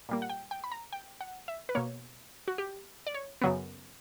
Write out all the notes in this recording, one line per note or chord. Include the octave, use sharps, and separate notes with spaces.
A#2 G3 A#3
F#5
G5
G5
B5
A#5
G5
F#5
E5
B4
B2 A#3 C#5
F#4
G4
D5
C#5
F#2 C#3 F#3 B3